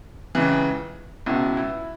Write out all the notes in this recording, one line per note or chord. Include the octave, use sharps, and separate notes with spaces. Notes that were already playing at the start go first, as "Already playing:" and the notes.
C#2 C#3 E3
C#2 B2 E4
E4